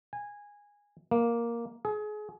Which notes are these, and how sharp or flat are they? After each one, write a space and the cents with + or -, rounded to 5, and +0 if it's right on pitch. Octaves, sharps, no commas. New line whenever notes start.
G#5 -15
A#3 +5
G#4 +30